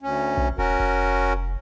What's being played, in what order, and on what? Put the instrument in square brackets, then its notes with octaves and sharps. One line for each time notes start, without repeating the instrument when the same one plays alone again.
[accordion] D2 C#4
[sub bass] B1
[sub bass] E1 [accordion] C#4 F#4 A#4
[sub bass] F1